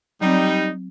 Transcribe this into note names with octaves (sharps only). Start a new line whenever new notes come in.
F#3 G3 C4 D#4